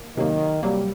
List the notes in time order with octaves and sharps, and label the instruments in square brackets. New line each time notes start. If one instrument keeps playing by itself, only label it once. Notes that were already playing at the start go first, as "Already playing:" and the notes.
Already playing: [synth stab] A#3
[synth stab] C3 F#3 A#3 [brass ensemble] D#3
[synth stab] C3 F#3 A#3 [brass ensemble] G3